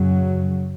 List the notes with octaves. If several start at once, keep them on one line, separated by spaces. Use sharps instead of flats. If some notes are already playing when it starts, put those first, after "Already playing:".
Already playing: F#2 C#3 F#3